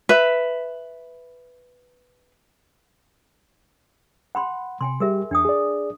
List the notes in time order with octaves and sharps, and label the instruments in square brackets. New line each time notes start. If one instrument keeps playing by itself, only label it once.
[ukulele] B4 E5
[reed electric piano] F#5 [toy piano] G5 B5 C6
[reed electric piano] C3 [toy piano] G5 G#5 C6
[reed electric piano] G3 G4 [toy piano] G#4 A#4 E5
[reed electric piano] E2 [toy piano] D4 G5 D#6
[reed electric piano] G#4 D5